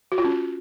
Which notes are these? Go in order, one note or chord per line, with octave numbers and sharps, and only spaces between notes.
F#4
F4
C#4